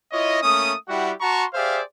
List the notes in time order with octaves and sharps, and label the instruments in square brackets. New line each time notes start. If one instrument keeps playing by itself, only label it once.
[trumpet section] E4 F4 C#5 D#5
A3 A#3 C#4 D#6
G3 E4 F#4 G4 F#5
F#4 A5 A#5 C6 C#6
G4 G#4 C5 D5 E5 F5